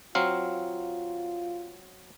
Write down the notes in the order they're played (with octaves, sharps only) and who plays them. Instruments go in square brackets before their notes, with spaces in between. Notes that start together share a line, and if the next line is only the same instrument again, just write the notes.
[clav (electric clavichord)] F#3 C4 F5 [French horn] F4